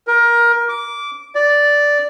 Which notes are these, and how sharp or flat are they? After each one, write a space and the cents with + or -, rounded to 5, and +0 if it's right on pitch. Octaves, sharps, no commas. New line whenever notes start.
A#4 +20
D6 -15
D5 -5